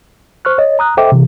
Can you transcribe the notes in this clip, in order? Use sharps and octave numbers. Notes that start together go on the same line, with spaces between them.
C5 C#6 F6 F#6
C#5 D#5
A#5 D#6 F#6
A4 C5 D#5 E5 G5 D6
C3 E3